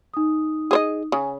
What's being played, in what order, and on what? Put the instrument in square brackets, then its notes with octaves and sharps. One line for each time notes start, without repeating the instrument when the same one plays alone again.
[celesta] D#4 D#6
[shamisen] G#4 C5 D#5
[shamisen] C#3 [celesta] G#5